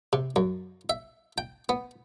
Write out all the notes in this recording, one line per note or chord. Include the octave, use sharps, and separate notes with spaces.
C3
F#2
E5
G5
B3